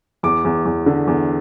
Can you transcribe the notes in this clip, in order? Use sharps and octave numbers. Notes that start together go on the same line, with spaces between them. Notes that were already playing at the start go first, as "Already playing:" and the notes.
E2 D6
E2
E2
D3
E2